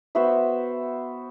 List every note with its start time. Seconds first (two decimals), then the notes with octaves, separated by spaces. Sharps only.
0.15 B3 F#4 C5 E5